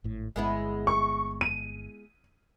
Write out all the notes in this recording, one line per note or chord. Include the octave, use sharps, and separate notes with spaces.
G#1 A2
G1 G#3 B3 E4
C#6
D#7